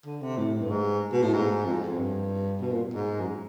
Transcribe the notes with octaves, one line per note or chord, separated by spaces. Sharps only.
D3
C3
A2
G2
G#2
B2
A2
G#2
F2
F2
G2
B2
A#2
G#2
F#2